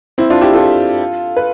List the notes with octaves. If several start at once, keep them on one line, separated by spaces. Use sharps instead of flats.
C4 E4
D4 F4
E4 G4
F4 A4
B4